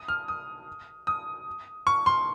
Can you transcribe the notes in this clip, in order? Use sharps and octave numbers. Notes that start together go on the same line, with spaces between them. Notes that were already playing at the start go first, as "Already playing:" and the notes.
Already playing: D#6
F6
D#6
D#6
C#6
C6